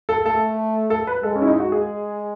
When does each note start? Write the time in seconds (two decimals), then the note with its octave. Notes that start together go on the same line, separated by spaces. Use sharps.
0.09 A4
0.26 A3 A4
0.90 A4
1.07 B4
1.23 G#3 A4
1.36 C#4
1.42 E4
1.47 D#4
1.60 F#4
1.71 G#3 G#4